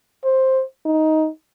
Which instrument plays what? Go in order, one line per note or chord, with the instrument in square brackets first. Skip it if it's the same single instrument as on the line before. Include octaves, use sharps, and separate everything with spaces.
[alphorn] C5
D#4